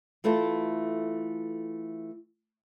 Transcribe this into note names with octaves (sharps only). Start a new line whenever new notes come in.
E3 A3 E4 F4 A4